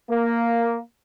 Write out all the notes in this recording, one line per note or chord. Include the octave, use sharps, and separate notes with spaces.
A#3